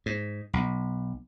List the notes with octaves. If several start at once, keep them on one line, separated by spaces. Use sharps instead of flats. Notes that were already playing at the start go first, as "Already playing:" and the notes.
G#2
B1